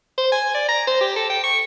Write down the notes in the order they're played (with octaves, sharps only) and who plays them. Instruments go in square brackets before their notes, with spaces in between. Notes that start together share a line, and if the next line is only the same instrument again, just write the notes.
[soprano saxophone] C5
G#5
D5
A#5
C5
G4
A4
G5
C#6